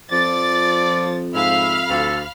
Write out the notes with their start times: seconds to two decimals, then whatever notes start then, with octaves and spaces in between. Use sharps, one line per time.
0.12 F2 F3 D5 A6
1.35 G#2 E5 F5 B5 F6
1.90 D2 A4